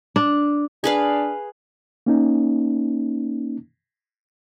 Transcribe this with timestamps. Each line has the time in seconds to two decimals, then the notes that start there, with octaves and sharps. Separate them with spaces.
0.16 D4
0.84 D4 G#4 B4 F5
2.06 A#3 C#4 D#4